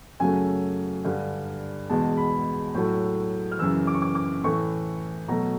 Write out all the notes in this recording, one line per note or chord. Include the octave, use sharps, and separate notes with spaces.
F#2 C#3 F#3 A3 G#5
G2 D3 G3
E2 B2 G#3 A5
B5
A2 F#3 A3
F6
F#2 C#3 E3 E6
D6
C#6
D6
D6
A2 E3 A3 C#6
B2 F#3 A3 A#5